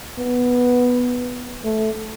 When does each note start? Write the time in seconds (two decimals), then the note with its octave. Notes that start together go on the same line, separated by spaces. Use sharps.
0.19 B3
1.65 A3